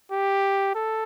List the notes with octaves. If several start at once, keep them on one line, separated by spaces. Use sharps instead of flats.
G4
A4